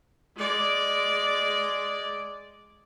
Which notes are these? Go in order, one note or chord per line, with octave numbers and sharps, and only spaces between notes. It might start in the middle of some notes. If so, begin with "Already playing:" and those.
G#3 D5